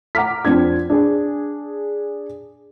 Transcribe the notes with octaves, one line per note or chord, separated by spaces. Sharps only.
F#5 A#5 D6 F6 B6
F2 C4 D4 G#6
D4 G#4